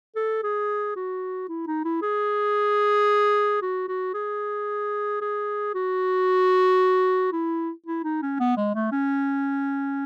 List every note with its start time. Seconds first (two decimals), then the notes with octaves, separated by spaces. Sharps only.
0.16 A4
0.43 G#4
0.96 F#4
1.49 E4
1.67 D#4
1.85 E4
2.02 G#4
3.62 F#4
3.88 F#4
4.14 G#4
5.21 G#4
5.75 F#4
7.33 E4
7.86 E4
8.04 D#4
8.22 C#4
8.40 B3
8.57 G#3
8.75 A3
8.92 C#4